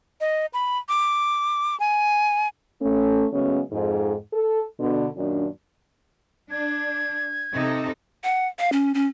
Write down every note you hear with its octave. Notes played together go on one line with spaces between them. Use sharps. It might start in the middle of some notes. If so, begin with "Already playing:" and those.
D#5
B5
D6
G#5
A3 C#4
C#3 F#3 G#3 A3 B3 C#4
F2 G#2
A4
B2 D3
F#2 A#2 D#3 D4
D4 G#6
C3 D#4 A4
F#5
F5
C#4
C#4